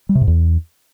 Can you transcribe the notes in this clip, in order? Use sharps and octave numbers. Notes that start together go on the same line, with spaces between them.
G3
C3
G#2
E2